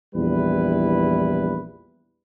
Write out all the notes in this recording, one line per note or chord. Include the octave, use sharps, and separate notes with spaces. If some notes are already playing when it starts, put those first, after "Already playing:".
A#1 E2 G3 E4 B4